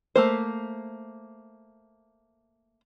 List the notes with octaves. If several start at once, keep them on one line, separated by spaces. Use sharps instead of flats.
A3 A#3 C5